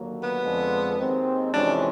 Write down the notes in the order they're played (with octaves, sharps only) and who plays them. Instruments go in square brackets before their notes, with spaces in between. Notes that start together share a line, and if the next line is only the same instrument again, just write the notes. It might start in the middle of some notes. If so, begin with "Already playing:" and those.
Already playing: [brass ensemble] D#2 D3 F#3 A#3
[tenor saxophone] B3
[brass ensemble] F2 D3 F3 G#3
D#2 D#3 G#3 C4
[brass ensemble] F2 C3 E3 G#3 C#4 [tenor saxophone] D4